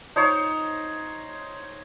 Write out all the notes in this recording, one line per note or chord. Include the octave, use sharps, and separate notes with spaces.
D#4 C5 C#5